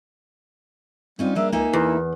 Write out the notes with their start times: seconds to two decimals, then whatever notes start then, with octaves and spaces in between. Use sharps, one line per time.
1.19 G3 C4 C#4 D#4 F4
1.35 A#3 D4 G#4 E5
1.52 C#2 A#3 D#4 E5 G#5
1.73 E2 E4